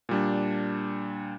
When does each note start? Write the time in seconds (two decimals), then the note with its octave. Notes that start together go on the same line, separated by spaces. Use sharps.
0.09 A#2 G3 D4